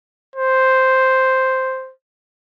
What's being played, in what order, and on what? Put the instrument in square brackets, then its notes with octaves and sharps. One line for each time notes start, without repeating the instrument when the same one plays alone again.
[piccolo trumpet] C5